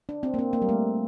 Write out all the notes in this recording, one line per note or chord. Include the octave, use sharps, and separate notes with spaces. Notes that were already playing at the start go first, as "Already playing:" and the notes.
D4
C4
A#3
C4
A#3
G3
A3